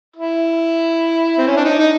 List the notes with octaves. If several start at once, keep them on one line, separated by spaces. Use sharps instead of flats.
E4
C4
C#4
D4
D#4
D#4